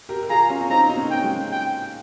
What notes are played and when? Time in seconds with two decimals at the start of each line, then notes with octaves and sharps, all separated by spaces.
0.09 G4 A#4
0.23 A#4
0.29 F4 G#4 A#5
0.49 C#4 F4
0.61 C#4
0.70 C4 D#4 A#5
0.89 D#4
0.97 A#3 C#4
1.10 G5
1.18 C#4
1.24 G#3 C4
1.52 G5